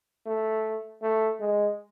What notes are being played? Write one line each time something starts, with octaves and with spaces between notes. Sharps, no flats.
A3
A3
G#3